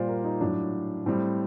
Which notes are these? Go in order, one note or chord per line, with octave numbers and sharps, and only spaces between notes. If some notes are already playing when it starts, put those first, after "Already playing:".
Already playing: A#2 G3 C5 D5
A#4
D#4
A2 F#3 D4
A2 G3 C4